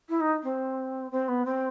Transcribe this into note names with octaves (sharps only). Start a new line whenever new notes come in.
E4
D#4
C4
C4
B3
C4